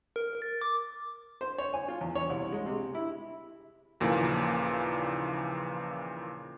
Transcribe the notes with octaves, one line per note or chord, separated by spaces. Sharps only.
A#4
A6
D6
C5
C#5
G#5
F4
E2
C#5
C2
G#3
C3
E4
D#2 A#2 C#3 E3 F3 A#3